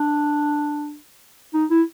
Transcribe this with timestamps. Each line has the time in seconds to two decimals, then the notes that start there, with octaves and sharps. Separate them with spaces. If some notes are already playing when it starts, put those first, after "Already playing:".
Already playing: D4
1.54 D#4
1.71 E4